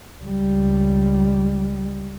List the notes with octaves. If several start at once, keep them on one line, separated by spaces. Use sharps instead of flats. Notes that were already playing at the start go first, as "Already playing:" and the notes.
C#2 G3